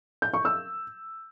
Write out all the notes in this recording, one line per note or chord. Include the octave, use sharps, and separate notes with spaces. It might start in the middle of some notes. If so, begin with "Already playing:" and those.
G6
C#6
E6